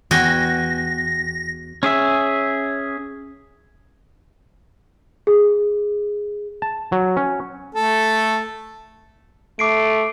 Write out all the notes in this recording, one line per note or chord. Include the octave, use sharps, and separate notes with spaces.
E2 F#4 G5 G#5 A#6
C#4 G#4 E5
G#4
A5
F#3
C#4
A3 A4
A3 D6 C7 D7